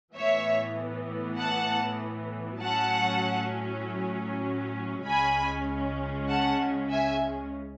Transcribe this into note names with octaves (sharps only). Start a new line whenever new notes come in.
A2 E3 B3 C#5 E5
F#5 A5
A2 F#3 C#4 F#5 A5
C#2 C#3 G#3 C#4 G#5 B5
F#5 A5
E5 G#5